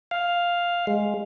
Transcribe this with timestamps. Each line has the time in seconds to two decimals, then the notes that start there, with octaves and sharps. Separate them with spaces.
0.11 F5
0.87 G#3